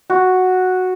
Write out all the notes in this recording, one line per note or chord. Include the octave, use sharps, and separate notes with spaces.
F#4